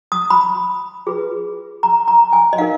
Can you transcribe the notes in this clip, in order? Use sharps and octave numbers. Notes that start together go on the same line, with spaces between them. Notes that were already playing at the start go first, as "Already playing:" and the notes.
D#6
B5
F4 G#4 B4
A#5
A#5
G#5
D#5
D#4 A#4 F5